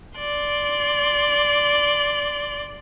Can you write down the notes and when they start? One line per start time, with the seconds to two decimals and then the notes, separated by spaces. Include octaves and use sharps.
0.19 D5 C6